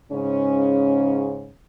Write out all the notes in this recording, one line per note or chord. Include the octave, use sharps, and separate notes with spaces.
G#2 C#3 C#4